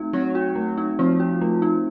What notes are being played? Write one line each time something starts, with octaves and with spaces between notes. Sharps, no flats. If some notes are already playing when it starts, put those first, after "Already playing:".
Already playing: A3 C4 D#4 F#4
F#3 C4
F#4
A3
D#4
F3 C4
F#4
A3
D#4